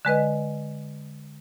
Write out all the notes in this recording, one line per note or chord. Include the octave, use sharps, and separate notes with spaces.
D3 G#3 B4 D#5